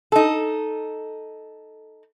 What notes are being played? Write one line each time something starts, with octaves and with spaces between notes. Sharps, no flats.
D#4 A4